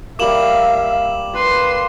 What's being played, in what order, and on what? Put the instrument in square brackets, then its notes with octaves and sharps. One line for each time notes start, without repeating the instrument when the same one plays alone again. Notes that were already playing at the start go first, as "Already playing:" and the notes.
[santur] G3 A#3 [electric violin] E5 F5 [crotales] D6 E7 F#7
[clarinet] B4 [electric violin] C6 C7